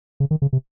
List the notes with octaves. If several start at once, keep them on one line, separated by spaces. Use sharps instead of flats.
C#3
D#3
C#3
C3